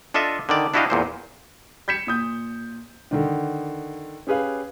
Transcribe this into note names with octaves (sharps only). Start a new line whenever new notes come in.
D4 F4 A4 D#5 E5
D3 D#3 D5
D4 E4 F#4 G4 D#5 F5
E2 A#2 C5
G6 G#6 B6 C#7 E7
A#2 D#6 G6
D3 D#3 D4
C#4 G4 G#4 B4 F5